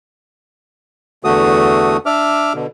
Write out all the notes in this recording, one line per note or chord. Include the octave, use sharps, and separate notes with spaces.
E2 D3 A3 F#4 D#6
D4 E5 D6 F6
B2 D3